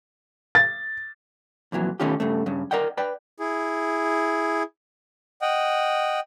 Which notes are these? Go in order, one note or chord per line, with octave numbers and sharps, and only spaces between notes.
A6
F2 A#2 E3 F#3
B2 D#3 A3 C#4 F4 G4
G2 C#3 A3
G2 C#3
A#4 D5 D#5 F#5 G5
B4 D5 G5
E4 G#4
D#5 F#5 G5